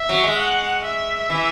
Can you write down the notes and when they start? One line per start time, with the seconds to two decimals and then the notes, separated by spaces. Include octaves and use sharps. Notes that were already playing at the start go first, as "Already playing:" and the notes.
Already playing: E5
0.09 F#3
0.23 G#3
0.39 F#5
0.85 E5
1.30 E3